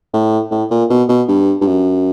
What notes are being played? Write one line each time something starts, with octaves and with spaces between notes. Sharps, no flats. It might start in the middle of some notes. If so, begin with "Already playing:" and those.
A2
A2
A#2
B2
B2
G2
G2
F#2